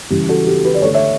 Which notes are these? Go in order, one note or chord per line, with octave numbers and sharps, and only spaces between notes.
C#3 E3 G3 G4
F#4 A4
G4
G4 B4
D5
D3 A3 A4 C#5
C#5 E5